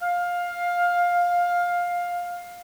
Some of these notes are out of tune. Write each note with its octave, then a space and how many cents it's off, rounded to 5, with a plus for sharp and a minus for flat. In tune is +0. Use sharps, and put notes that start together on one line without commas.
F5 +15